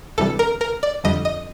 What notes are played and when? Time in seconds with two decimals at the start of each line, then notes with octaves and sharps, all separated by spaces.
0.18 D2 C3 E3 G3 A4
0.39 A#4
0.61 A#4
0.83 D5
1.04 F2 D3 G3 D#5
1.25 D#5